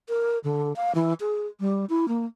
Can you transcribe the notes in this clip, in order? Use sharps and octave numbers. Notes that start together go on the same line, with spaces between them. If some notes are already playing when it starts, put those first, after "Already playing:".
A#4
D3
F5
E3
G#4
G3
E4
A#3